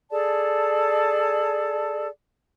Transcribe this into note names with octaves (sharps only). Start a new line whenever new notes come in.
G#4 A4 D5 A5